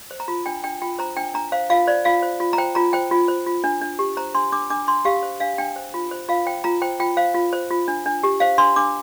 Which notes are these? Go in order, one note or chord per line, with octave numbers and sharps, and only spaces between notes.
C5
A#5
F4
D4 G5
D4 G5
F4 G5
C5 A#5
D4 G5
D4 A#5
C5 F5
F4 F5
C5 D5
F4 F5
C5
F4
A#5
C5 G5
F4 A#5
C5 G5
F4
C5
F4
D4
D4
G4
C5 A#5
D4 C6
D4 D6
D4 D6
D4 C6
G4 F5
C5
D4 F5
D4 G5
C5
F4
C5
F4 F5
C5 G5
F4 A#5
C5 G5
F4 G5
C5 F5
F4
C5
F4
D4
D4
G4
C5 F5
D4 C6
D4 D6